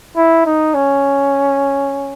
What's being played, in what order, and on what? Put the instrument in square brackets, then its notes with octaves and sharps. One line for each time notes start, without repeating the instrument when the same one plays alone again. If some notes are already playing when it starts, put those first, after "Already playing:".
[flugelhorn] E4
D#4
C#4